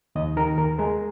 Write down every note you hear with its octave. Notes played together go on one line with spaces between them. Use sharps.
D#2 D#5
D#3 A#4
D#2 A#4
G#3 A#4